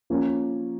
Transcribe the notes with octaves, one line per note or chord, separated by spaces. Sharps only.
F3 A#3 C#4